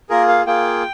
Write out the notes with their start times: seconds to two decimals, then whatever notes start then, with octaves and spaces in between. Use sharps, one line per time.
0.10 A#3 F4 G#4 A#4
0.28 F5
0.46 A#3 F4 G#4 G5